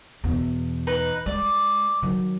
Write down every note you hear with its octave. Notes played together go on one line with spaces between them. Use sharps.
E2 B2
D#4 B4
G#3 D5
D#3 F#3